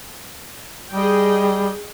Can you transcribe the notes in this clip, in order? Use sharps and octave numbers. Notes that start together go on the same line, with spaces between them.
G3 G#4 D#5 G5